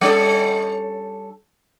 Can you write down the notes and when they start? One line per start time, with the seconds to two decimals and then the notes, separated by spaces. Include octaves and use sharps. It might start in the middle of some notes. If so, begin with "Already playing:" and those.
0.01 G3 C#4 A4